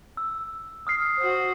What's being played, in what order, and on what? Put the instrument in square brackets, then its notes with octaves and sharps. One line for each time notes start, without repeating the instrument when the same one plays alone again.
[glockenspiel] E6
D#6 F6 C7
[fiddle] F#4 C5